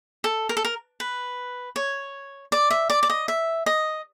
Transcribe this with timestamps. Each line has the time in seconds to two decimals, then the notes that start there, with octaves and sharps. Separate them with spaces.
0.24 A4
0.49 A#4
0.57 A4
0.65 A#4
1.00 B4
1.76 C#5
2.52 D5
2.70 E5
2.90 D5
3.03 D5
3.10 D#5
3.28 E5
3.66 D#5